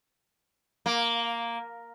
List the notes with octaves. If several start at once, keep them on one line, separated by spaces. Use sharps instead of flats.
A#3